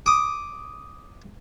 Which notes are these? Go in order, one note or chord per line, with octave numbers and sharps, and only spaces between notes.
D6 D#6